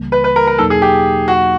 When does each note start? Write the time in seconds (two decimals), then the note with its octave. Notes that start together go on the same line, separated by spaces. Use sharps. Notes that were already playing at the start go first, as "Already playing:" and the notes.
Already playing: C#2 C#3 E3 G3 A#3
0.12 B4
0.24 B4
0.36 A#4
0.47 A#4
0.58 E2 B2 F#3 A#3 D#4 A4
0.70 G#4
0.82 G4
1.28 F#4